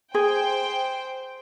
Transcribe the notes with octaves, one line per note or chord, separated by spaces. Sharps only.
G#4 C5 G5